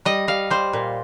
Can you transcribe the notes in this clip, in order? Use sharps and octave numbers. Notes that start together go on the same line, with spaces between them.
G3 D#5
G3 F5
G3 C5
A#2